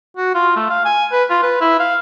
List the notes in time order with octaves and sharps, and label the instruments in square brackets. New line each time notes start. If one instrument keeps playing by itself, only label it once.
[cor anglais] F#4
F4
A3
F5
G#5
B4
F4
B4
E4
F5